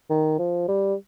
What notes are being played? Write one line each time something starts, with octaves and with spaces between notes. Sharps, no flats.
D#3
F3
G3